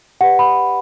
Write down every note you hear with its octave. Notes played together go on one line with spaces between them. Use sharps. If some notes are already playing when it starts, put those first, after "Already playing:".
G4 B4 D5 F#5
B5